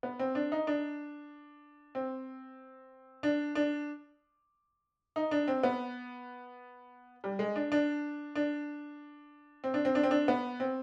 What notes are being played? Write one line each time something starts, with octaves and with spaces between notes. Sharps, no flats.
B3
C4
D4
D#4
D4
C4
D4
D4
D#4
D4
C4
B3
G3
G#3
D4
D4
D4
C4
D4
C4
D4
C4
D4
B3
C4